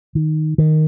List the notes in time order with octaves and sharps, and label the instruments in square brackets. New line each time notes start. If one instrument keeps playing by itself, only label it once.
[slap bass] D#3
D#3